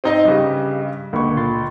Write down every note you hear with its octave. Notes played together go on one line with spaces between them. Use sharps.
C4 D#4 D#5
G2 C#3 G4 D#5
C#2 D3 A#3 C#6
A#2 C6 A6